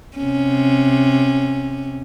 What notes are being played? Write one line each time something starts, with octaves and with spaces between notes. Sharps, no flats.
C3 C#4